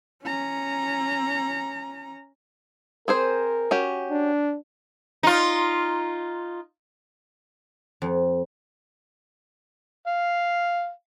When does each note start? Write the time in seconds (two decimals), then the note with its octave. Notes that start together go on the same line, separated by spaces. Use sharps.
0.23 C#4 A#5
3.08 C4 G#4 A#4 C5
3.71 C#4 F#4 G4
4.11 D4
5.23 D#4 F4
8.02 F2
10.07 F5